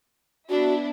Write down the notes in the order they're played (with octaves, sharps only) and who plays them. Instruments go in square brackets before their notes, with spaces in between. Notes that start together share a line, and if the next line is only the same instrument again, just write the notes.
[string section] B3 D4 E4 [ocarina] F#4